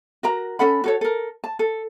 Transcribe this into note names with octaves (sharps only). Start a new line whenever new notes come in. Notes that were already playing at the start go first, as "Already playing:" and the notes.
F#4 A#4 A#5
C#4 A4 F#5 B5
F#4 A4 C#5
A4 A#4
A5
A4